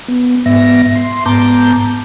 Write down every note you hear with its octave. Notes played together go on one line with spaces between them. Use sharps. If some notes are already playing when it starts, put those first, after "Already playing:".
B3
G#2 B3 E5 A#6
C6
G#2 B3 A5 A#5 D6 G6